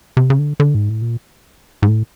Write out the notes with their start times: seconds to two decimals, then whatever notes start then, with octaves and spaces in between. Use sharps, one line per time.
0.17 C3
0.30 C#3
0.39 D3
0.60 D3
0.75 G#2
0.89 A2
1.02 A#2
1.82 G#2
1.88 A2